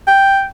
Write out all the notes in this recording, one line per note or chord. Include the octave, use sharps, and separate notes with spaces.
G5